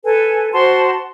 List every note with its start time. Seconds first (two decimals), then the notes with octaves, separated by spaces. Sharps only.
0.04 A4 B4 G#5
0.52 F#4 C5 A5 C6